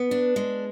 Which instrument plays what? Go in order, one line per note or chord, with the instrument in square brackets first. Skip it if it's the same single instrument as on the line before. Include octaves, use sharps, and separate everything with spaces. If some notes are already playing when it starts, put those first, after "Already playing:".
Already playing: [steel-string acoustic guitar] B3
D4
G#3